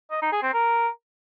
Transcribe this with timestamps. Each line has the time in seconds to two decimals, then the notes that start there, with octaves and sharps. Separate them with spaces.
0.11 D#5
0.22 D#4
0.32 G#4
0.43 C4
0.53 A#4